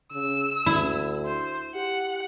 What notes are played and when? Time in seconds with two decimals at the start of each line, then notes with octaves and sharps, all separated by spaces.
0.13 C#3 E6
0.66 D2 E4
1.26 C5
1.75 G4 F#5